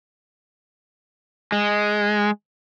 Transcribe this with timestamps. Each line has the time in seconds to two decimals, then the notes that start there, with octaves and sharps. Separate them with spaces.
1.52 G#3